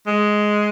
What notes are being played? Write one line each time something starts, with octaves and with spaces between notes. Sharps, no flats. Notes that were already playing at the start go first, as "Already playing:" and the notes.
G#3